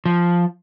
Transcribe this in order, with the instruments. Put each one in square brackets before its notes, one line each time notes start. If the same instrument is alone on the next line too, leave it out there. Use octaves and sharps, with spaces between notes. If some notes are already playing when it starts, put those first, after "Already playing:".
[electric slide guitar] F3